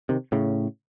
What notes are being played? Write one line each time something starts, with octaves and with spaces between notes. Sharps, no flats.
C3 D#3
A2 C#3